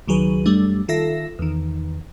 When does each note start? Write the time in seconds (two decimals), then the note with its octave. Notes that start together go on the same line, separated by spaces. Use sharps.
0.08 C#2 D#3 F#3 G#4 B4
0.46 F#2 G3 A3 D4
0.88 D#3 F4 A4 E5 A#6
1.39 E2 D#3